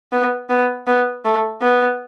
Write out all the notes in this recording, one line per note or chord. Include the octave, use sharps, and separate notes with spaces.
B3
B3
B3
A3
B3